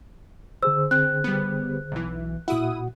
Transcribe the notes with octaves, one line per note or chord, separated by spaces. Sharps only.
D3 G#4 C5 E6
C4 F#6
G3 B3
B1 E3
A#2 E4 F#4 F#5 D#6